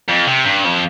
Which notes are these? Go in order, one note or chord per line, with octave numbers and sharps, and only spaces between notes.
F2
C3
G2
F2